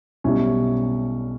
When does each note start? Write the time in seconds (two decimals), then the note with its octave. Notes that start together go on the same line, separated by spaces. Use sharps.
0.24 B1 B2 G3 C#4 E4